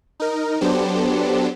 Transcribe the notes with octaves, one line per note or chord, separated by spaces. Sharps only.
D#4 A#4
F#3 B3 D4 G4 A4 C5